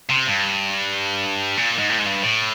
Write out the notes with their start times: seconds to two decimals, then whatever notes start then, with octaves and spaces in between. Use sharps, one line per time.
0.10 C3
0.27 G2
1.58 A#2
1.79 G#2
1.90 A2
1.99 G#2
2.06 G2
2.23 A2